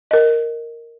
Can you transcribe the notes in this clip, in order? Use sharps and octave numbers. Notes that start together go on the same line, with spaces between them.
A#4 D#5